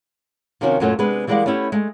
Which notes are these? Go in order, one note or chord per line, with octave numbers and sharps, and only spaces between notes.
C3 D#3 F3 C#4 E4 F#4
F#2 A#2 F#3 A3 C#4 F4
C3 G#3 B3 D4 B4
E3 G3 G#3 A#3 D5 F#5
A3 B3 C#4 E4 G4
G#3 A3